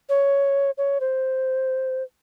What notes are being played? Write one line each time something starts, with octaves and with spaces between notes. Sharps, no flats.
C#5
C#5
C5